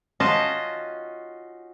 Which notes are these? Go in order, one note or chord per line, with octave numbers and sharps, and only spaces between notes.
C#4 D#4 F4 F#4 D#5 A5